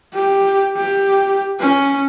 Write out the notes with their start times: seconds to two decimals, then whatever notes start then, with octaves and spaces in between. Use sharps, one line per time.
0.14 G4
0.77 G4
1.60 C#4